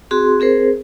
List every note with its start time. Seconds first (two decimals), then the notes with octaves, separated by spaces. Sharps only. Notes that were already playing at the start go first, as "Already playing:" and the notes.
0.11 C4 F#4 G#4 C6
0.40 C4 G#4 A#4 C5